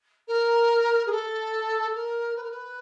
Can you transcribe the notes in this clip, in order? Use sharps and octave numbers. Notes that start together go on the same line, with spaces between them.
A#4
G#4
A4
A#4
B4
A#4
B4